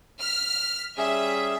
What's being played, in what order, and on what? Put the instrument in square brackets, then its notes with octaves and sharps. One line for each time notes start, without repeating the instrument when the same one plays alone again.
[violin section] F6 B6
[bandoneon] G3 C#4 G#4 [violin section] E5